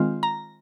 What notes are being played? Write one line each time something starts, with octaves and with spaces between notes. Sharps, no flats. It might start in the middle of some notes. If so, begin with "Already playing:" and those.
Already playing: D#3 G#3 C4 F4
A#5